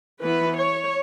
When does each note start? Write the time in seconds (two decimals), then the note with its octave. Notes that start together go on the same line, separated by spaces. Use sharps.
0.21 E3 B3 B4
0.58 C#5